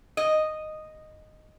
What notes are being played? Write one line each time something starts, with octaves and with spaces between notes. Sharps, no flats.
D#5